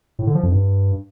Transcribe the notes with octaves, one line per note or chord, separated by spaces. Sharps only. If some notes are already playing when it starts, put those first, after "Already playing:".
A2
D3
F3
F2
G2